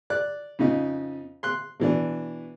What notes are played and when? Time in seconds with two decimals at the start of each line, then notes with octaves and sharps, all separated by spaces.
0.10 D5 F#6
0.59 F2 C#3 D#4
1.43 C6 F#6
1.80 B2 E3 D4